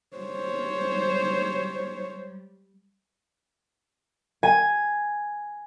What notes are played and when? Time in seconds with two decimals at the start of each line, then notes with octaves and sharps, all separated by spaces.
0.17 G3 C5 C#5
4.43 G#5